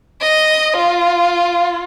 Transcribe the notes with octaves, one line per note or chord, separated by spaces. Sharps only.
D#5
F4